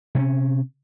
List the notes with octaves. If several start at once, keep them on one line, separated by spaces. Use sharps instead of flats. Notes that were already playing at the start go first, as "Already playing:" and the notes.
C3 C4 C#4